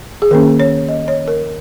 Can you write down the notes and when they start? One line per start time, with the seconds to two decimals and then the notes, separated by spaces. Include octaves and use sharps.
0.22 G#4
0.31 D#3 A#3 C#4 A#4
0.60 C#5
0.88 D#5
1.08 C#5
1.28 A#4